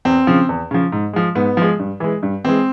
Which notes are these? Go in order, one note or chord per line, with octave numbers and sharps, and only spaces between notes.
E2 C4
C#3 F3
E2
C#3 F3
G#2
F3 G#3
G#2 B3
F3 G#3
G2
E3 G#3
G2
E3 G#3 C4